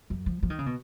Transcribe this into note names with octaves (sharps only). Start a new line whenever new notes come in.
F#2
F3
F3
D#3
C#3
B2